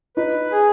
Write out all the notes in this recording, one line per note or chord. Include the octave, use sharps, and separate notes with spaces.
D#4 B4
G#4